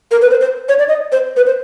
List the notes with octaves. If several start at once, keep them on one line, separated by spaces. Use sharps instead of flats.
A#4
B4
C5
C5
C#5
D5
D#5
C5
B4
C5